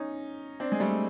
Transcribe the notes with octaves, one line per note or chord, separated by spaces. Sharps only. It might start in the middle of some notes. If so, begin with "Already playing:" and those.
Already playing: C#4 D#4
C4 D4
G#3
G3 A3